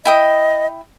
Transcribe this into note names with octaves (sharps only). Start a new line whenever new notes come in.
E4 D#5 G5 D#6